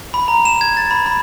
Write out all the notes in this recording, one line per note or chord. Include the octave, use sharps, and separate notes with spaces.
B5
A#5
E7
G#6
A6
B5
B5